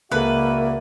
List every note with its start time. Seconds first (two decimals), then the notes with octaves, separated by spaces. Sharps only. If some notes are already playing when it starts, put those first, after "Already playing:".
0.12 C#2 A#3 F#4 G#4 A4 B4 D5 E5